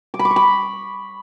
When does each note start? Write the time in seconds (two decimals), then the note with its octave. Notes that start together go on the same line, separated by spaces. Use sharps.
0.14 D6
0.19 B5
0.25 D6
0.31 C#6
0.36 B5